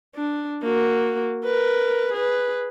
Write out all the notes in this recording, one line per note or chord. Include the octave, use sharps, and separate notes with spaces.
D4
A#3 F#4
A#4 B4
G#4 B4